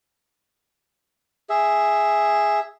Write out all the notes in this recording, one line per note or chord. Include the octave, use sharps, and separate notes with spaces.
G#4 E5